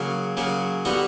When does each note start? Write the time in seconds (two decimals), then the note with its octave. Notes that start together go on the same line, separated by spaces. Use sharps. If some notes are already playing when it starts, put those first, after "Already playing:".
Already playing: C#3 F#3 A#3
0.37 C#3 F#3 A#3
0.85 D3 G3 B3 D#4 F#4